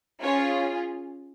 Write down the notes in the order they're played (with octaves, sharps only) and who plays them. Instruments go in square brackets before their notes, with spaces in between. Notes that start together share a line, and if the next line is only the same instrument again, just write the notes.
[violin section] C#4 F4 G#4 C#5